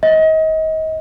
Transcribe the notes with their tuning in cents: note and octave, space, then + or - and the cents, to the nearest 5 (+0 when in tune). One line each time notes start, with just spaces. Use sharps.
D#5 +30